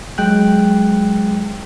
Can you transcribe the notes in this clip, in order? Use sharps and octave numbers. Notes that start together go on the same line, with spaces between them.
F#3 G#3 G5 F#6